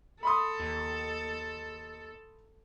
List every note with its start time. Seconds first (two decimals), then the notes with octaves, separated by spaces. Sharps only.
0.23 A4 B5 C6 D#6
0.60 D#2